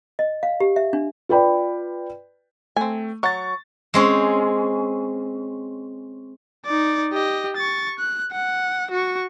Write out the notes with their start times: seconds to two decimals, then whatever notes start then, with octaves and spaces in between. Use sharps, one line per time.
0.19 D#5
0.43 F5
0.60 G4
0.76 E5
0.93 D4
1.29 F4 B4 D5 G5 B5
2.76 A3 C4 G#5
3.23 F#3 F#5 C#6 A6
3.94 G#3 C4 C#4
6.65 D#4 D5
7.13 G4 D#5
7.56 C#6 A6
7.99 F#6
8.32 F#5
8.91 F#4 C#6